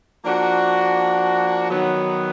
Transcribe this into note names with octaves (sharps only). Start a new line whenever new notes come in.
F3 A#3 D4 F#4
D#3 F#3 B3